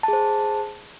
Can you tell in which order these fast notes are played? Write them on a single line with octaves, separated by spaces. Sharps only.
A5 G#4 C5